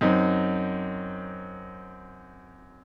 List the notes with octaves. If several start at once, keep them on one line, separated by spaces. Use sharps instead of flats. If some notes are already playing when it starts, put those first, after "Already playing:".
F#2 C4 D#4